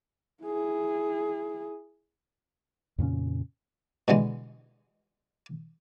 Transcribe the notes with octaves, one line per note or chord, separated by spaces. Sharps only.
E4 G#4
F2 A#2 C#3 C#4
B2 D3 E3 G#3